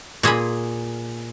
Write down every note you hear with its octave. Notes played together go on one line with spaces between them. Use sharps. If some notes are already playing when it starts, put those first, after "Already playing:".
A#2 G#4 G#5 B5